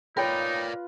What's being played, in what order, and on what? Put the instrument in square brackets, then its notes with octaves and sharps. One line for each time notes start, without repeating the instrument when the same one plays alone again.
[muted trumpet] D#4 [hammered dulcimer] F4 B4 [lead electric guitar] A#4 D5 [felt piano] C#5 G5 B5